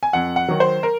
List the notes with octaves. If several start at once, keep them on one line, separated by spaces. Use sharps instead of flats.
G#5
F2 F#5
F#5
D#3 F#3
C5
A#4